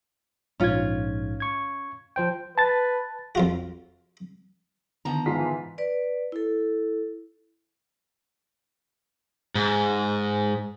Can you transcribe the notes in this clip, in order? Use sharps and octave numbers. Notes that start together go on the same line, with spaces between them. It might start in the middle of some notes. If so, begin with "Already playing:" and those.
A#1 G#2 C#4 F4 G#6
C#6 G#6
F3 C5 G5
B4 A5 A6
F2 F4 F#4
D3 D#3 F3 B3 A#5
G#2 E3 F4 B6
B4 D5
E4 A4
G#2